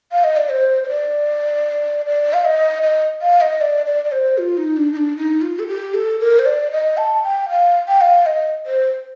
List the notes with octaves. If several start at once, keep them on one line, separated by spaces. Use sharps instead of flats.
F5
D#5
D5
C5
C5
D5
D5
F5
D#5
D#5
F5
D#5
D5
D5
D5
C5
F4
D#4
D4
D#4
D4
D#4
F4
A4
G4
A4
A#4
C5
D5
D#5
A5
G5
F5
G5
F5
D#5
C5